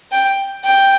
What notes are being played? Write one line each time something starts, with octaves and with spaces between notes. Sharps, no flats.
G5
G5